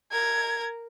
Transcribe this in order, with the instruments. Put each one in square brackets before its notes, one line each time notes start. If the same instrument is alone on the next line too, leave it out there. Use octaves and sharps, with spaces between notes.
[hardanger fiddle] A#4 [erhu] G#6